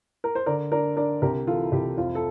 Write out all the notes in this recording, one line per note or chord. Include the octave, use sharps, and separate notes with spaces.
A#4
C5
D3 A#4 D5
D4 A#4 D5
D4 A#4 D5
C2 G4 A#4
E3 F4 A4
C2 G4
F2 F4
A4